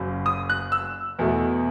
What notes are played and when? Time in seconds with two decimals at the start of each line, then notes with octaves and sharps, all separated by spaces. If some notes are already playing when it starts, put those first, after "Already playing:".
Already playing: F#1 F#2 F#3
0.26 D#6
0.50 F#6
0.72 E6
1.19 E2 B2 A3